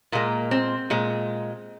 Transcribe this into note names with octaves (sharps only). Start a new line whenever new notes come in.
A#2 G#3 A#3
C4
A#2 G#3